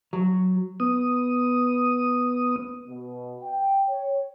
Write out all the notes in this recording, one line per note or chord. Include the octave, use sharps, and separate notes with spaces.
F#3
B3 D#6
B2
G5
C#5